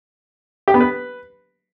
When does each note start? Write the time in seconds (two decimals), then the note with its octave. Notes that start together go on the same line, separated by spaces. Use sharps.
0.68 G4
0.74 B3
0.80 B4